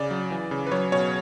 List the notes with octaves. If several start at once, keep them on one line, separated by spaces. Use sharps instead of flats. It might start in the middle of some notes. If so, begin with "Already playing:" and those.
Already playing: C#3 D5
F#3
E3
C#3
B4
F#3 C#5
B2 C#5